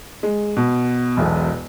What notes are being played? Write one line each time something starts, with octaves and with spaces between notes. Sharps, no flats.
G#3
B2
E1 B1 E2